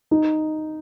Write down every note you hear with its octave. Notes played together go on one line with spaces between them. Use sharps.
D#4